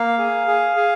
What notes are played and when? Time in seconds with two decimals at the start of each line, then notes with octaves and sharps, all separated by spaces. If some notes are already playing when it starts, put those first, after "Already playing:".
Already playing: A#3 F5
0.18 G#4
0.48 G#4
0.76 G#4